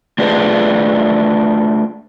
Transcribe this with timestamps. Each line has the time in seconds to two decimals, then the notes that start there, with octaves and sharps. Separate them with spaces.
0.18 A3 D4 F4 G#4 B4 C5